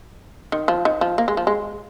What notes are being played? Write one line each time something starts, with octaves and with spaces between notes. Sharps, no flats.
D#3
F3
D#3
F3
A#3
G#3
F3
G#3